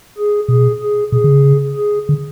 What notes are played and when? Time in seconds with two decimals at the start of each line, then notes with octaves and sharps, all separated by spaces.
0.18 G#4
0.48 B2 G#4
0.82 G#4
1.12 B2 G#4
1.24 D3
1.29 C#3
1.76 G#4
2.09 D3